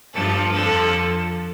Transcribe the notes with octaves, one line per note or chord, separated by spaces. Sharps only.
G2 F3 A4
F2 D3 F3 A4